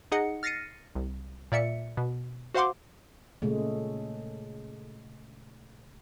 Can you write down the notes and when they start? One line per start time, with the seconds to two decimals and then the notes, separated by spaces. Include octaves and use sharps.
0.12 D#4 G#4 D#5 F#5 C#7
0.43 F6 A6 A#6 C7 C#7 D#7
0.95 C2
1.52 A#2 D5 E5 C#7
1.97 B2
2.54 F#4 C5 F5 F#5 C6 D6
3.42 A#2 C#3 G#3 A3